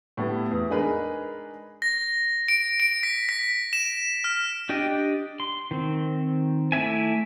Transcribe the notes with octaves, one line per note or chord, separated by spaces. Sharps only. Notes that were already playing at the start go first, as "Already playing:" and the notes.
A2 G3 B3
E2
G#3 D4 D#4 G#4 A#4 B4
A#6
D7
D7
B6
B6
E7
F6
D4 G4 D5 D#5 G5
C6
D#3 C4
A3 E4 D5 E5 G#5